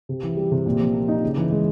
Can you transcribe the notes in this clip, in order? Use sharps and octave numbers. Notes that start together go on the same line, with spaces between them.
C3
E3
G3
C3
A#2
F3
A#3
D#4
C#3
E3
G#3